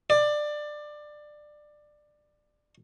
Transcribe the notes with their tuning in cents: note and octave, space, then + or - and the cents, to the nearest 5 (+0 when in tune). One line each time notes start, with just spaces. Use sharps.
D5 +20